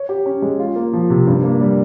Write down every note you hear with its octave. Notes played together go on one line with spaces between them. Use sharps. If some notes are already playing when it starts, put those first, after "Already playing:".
Already playing: C#5
G4
C#4
G#3
F4
A#3
F3
C3
G2
A#3
G3